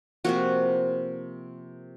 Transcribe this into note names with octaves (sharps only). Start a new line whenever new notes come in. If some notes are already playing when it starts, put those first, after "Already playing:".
C3 F3 A#3 F#4